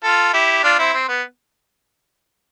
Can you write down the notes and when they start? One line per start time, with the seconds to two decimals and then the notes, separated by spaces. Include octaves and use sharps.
0.04 F4 A4
0.33 E4 G4
0.63 D4 F4
0.79 C4 E4
0.94 C4
1.09 B3